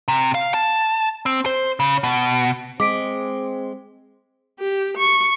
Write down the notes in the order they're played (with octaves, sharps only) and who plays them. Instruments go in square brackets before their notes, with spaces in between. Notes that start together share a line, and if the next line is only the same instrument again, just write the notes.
[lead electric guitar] C3
F5
A5
C4
C5
C#3
B2
[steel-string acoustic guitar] G#3 [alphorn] C4 [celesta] D6 B6 D7
[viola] G4
C#6